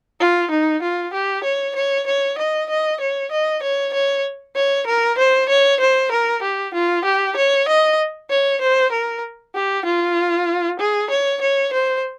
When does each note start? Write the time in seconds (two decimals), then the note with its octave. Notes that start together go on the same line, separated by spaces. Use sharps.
0.20 F4
0.51 D#4
0.82 F4
1.13 G4
1.44 C#5
1.76 C#5
2.07 C#5
2.38 D#5
2.70 D#5
3.00 C#5
3.31 D#5
3.63 C#5
3.93 C#5
4.56 C#5
4.87 A#4
5.18 C5
5.49 C#5
5.80 C5
6.11 A#4
6.42 G4
6.74 F4
7.05 G4
7.36 C#5
7.68 D#5
8.30 C#5
8.61 C5
8.92 A#4
9.55 G4
9.85 F4
10.79 G#4
11.10 C#5
11.41 C#5
11.73 C5